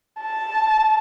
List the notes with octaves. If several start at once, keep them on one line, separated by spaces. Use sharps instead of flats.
A5